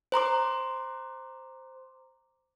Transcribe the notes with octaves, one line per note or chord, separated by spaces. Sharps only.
C5 A#5 C6 D6